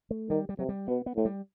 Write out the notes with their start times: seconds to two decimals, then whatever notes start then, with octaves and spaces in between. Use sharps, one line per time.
0.11 A3
0.30 D#3 G3
0.49 G3
0.59 C3 F#3
0.69 G3
0.88 B2 B3
1.06 B3
1.16 A2 A3
1.25 G3